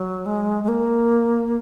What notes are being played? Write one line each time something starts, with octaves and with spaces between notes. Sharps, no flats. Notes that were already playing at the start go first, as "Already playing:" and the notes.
Already playing: F#3
G#3
G#3
A#3